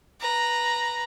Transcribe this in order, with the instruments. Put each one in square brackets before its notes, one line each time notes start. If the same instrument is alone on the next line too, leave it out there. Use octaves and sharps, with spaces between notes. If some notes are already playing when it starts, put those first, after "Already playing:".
[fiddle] B4 A#5